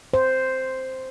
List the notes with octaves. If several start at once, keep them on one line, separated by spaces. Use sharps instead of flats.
C5